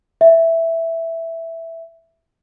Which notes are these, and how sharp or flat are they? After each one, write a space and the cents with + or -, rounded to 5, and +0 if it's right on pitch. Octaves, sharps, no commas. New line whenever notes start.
E5 +0